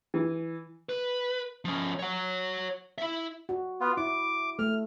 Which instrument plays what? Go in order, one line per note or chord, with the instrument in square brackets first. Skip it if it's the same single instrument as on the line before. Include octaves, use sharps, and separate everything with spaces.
[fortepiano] E3
[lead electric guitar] B4
F3 C#4
C#5 F#5
E4 E5
[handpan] F#4
[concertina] B3 F4
[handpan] E4 [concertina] D6
[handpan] A3 [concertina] F6